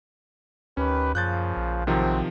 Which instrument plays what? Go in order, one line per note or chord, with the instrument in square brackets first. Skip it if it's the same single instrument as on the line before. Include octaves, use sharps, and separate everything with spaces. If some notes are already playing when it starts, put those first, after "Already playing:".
[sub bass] D2 [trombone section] D#3 G4 B4 [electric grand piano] C#4
[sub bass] F#2 [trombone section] A#2 C#3 F3 [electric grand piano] F#6 G6 A6
[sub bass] A#1
[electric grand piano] C3 D#3 F3 [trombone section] F#3 G#3 C4